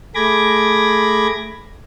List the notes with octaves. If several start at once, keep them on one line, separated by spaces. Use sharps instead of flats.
A3 G#4 B5 D6 G#6 A#6